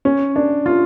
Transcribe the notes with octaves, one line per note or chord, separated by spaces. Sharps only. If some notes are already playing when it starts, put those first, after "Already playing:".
C#4
D4
F4